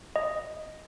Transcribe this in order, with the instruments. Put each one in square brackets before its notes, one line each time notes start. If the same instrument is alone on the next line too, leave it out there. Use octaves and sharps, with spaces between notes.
[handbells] D#5